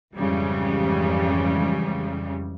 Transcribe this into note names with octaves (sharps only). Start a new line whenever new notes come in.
F2 G#2 C#3 E3 G3 G#3